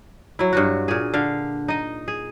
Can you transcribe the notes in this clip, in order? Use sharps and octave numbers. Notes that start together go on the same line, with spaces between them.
F#3 E4
G2 F#3 F#4
A#2 G#4
D3 F5
D#4 D#5
G#4